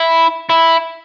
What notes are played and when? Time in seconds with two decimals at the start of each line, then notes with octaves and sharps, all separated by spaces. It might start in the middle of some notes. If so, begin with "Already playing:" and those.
Already playing: E4
0.50 E4